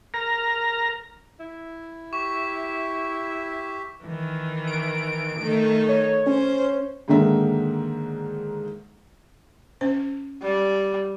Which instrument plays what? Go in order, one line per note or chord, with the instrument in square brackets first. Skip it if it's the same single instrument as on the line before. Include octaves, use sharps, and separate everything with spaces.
[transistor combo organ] A#4 A#5
[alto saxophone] E4
[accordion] G4 E5 [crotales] C#6
[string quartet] D#3 E3
[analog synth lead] D7
[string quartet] D#3 A3 D#4
[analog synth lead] C#5
[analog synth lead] C#4 [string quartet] C5
[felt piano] G#2 D3 D#3 A#3 E5
[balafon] C#4 C5
[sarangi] G3